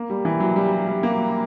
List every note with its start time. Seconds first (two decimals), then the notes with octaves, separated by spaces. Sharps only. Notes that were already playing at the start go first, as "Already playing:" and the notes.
Already playing: A#3
0.10 G3
0.25 E3
0.40 F#3
0.56 G3
0.87 G3
1.03 A#3